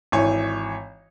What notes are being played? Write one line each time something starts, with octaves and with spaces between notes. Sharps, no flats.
G#1 E3 C#5 G#5